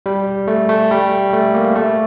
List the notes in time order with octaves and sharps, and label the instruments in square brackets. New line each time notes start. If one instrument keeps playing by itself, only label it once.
[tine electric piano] G3
A3
A3
G3
A3
A#3
A3